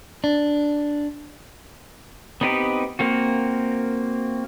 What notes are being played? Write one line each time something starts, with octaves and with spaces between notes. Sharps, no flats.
D4
B3 C4 D#4 G4 B4
A#3 C4 F#4